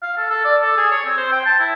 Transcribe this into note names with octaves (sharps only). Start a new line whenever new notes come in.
F5
A4
A4
D5
A4
G#4
C#5
C4
C5
G5
A5
E4